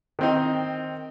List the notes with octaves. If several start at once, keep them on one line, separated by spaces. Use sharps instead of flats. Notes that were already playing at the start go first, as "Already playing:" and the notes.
D#3 C4 D#4